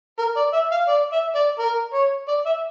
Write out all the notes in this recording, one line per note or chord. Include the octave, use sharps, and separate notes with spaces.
A#4
D5
E5
F5
D5
E5
D5
A#4
C#5
D5
E5